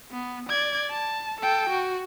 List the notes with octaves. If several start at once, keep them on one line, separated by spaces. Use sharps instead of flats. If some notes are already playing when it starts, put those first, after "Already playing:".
B3
D5 G#6
A5
A4 G5
F#4